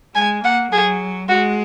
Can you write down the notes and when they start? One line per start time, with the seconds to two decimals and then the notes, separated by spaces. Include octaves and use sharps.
0.15 G#3 G#5
0.44 A#3 F#5
0.72 F#3 G#4
1.29 G#3 F#4